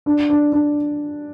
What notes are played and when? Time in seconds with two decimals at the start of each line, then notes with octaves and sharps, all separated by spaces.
0.06 D4
0.30 D4
0.52 D4